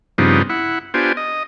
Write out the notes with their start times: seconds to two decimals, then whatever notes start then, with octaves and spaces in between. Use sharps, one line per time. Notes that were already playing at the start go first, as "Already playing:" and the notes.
0.18 G2 C#3 F3 B3 C4 D#4
0.50 E4 F#5
0.94 B3 D4 F4 G4 C5 G#5
1.17 D#5